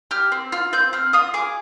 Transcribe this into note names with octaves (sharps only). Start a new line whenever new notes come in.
G4 F6
C4
F4 F6
C4 G6
C4 F6
F4 D#6
G#4 D6